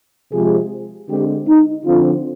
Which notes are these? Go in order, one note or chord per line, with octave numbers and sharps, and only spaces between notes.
C3 F3 G#3 G#4
D3 G#3 C4 G4
D#4
D3 F3 C4 F4